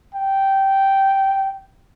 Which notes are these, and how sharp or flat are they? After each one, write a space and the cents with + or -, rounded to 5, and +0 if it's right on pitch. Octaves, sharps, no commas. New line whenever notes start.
G5 -10